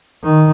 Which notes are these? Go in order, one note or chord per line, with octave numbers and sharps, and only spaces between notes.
D#3